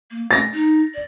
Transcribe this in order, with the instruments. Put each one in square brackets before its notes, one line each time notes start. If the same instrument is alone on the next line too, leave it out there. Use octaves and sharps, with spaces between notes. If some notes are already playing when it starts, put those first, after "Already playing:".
[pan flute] A#3
[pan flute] A3 [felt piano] A6 A#6
[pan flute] D#4
D5